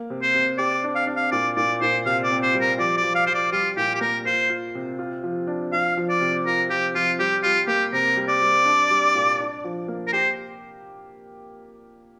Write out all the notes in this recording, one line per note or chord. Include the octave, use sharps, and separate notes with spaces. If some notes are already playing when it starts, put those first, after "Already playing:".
Already playing: A#3
C3
C5
C3
G4 D5
D4
F5
D4
F5
A#2 D5
A#2 D5
A#2 C5
C3 F5
D5
C4
C5
G3
A#4
F3 D5
D5
F3
F5
F3 C5
D5
G3 F4
A#2 G4
G4
A#3 A#4
F4 C5
F4
C3
F4
F3
D4
F3 F5
F3
D5
C3
F4 A#4
F3 G4
F3 F4
G3 G4
G3 F4
A#3 G4
C3 A#4
G3
D5
G3
D4
G3
A#2
D4
F3
A#3
A#4
G4 C5